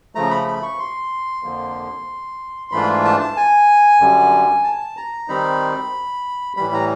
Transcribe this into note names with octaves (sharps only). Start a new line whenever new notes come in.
C#3 F3 A3 A#5
B5
B5
C#6
C6
F2 D3 F3 A#3
G#2 E3 A3 D4 F4 B5
A5
A5
G#5
F#2 D3 G3
A5
A#5
D#3 G3 C4 D#4 B5
A2 E3 G3 B5
A#5